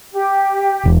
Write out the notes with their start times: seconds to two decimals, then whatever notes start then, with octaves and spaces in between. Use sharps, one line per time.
0.12 G4
0.85 E1